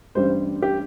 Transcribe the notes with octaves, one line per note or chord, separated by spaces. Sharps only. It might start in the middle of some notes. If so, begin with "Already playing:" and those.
A1 G2 G3 C5
G4